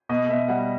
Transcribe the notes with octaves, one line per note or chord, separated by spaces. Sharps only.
B2 D#5
B2 E5
G3 F#5